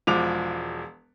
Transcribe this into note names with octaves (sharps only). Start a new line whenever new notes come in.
E1 F3 G#3 D6 F7